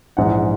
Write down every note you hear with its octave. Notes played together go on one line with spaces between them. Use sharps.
A#1 G#2 E3 F#5